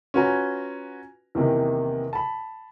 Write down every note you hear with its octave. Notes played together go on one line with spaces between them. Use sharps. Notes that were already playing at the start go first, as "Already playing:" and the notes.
C#4 F4 F#4 B4 G#5 A#5
E2 C3 D#3 A#3
A5 B5